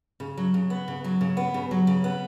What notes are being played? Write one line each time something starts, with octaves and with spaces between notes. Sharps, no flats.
C#3
F#3
C#3
B3
C#3
F#3
C#3
B3
C#3
F#3
C#3
B3